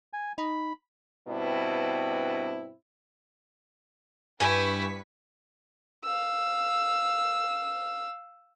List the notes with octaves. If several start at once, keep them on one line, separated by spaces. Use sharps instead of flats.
G#5
D#4 B5
G2 B2 C4 D4 E4
G2 E4 G4 B4 G#5 C#6 B6
F5 E6